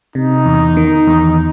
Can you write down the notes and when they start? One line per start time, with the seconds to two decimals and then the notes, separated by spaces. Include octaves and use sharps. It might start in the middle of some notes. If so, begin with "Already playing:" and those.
0.15 C3 D#4
0.46 E2
0.77 D#3
1.07 E2